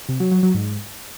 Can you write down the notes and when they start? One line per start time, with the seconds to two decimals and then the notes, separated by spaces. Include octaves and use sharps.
0.09 C3
0.20 F#3
0.31 F#3
0.43 F#3
0.54 G#2